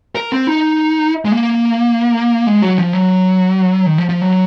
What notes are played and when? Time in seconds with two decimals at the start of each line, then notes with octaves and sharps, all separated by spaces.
0.15 A#4
0.32 C4
0.47 D#4
1.25 G#3
1.32 A#3
2.47 G#3
2.62 F#3
2.78 F3
2.93 F#3
3.86 D#3
3.98 F3
4.09 F3
4.21 F#3